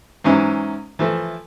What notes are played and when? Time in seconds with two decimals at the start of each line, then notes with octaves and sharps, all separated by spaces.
0.24 G#2 E3 F#3 C#4 D#4 E4
0.99 E3 F3 A3